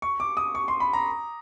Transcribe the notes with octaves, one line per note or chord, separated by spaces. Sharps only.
C#6
D6
D#6
C#6
C6
B5
A#5